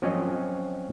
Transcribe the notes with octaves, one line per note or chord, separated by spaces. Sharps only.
F3 F#3 C4 C#4 C#5 D#5